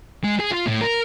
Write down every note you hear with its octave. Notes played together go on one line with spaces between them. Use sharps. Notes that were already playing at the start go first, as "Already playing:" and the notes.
G#3
G#4
F4
A2
A#4